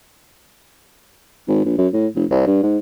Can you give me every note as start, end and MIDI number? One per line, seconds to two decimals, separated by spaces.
1.48 1.61 32
1.65 1.77 34
1.78 1.88 42
1.93 2.07 45
2.16 2.25 29
2.31 2.44 36
2.47 2.59 43
2.63 2.78 44